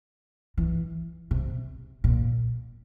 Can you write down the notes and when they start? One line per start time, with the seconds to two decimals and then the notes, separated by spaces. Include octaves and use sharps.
0.57 E3
1.31 C3
2.04 A#2